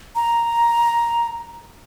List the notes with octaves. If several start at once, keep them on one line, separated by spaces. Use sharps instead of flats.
A#5